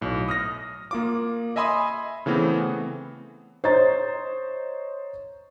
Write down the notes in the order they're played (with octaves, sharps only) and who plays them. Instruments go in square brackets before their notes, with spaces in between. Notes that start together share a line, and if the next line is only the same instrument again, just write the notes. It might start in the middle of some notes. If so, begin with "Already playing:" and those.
[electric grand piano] B1 A2
D#6 F6 A#6
A#3 F4 D6
D#5 E5 G#5 B5 C6 D#6
C#3 E3 A3 B3 C4
[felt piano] C5 C#5 D#5 A#5 A6